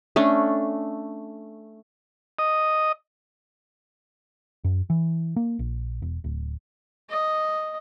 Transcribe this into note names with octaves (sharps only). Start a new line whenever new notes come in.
A3 C#4 D4
D#5
F#2
E3
A#3
A#1
E1
D1
D#5